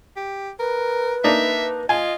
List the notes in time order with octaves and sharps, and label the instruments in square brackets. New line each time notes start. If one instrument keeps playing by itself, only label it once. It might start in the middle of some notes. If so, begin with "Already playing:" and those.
[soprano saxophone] G4
[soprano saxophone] A#4 [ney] B4
[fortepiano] A#3 D4 D#4 [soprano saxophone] E5
[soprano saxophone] F4 [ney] D#5 [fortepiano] G#5